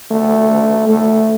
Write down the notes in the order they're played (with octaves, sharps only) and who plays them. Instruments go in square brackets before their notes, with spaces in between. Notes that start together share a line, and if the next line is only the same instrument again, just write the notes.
[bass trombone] A3
A3